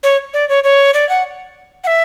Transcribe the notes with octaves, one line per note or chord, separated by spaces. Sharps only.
C#5
D5
C#5
C#5
D5
F#5
F#5
E5